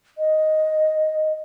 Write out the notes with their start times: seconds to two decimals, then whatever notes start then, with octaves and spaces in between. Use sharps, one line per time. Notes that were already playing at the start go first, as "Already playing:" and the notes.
0.18 D#5